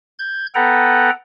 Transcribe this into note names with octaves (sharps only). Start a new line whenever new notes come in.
G6 G#6
B3 A4 B4 F#5 G5 A#5